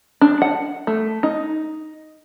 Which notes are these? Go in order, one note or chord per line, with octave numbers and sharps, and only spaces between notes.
D4
F#5
A3
D#4